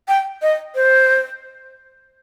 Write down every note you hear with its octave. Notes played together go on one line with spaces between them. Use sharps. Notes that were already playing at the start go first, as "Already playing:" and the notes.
G5
D#5
C5